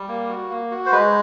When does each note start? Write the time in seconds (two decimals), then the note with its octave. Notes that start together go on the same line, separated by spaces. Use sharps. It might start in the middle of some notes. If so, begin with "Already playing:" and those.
Already playing: G3
0.08 A#3
0.29 F#4
0.50 A#3
0.71 F#4
0.86 C5
0.92 G#3 B4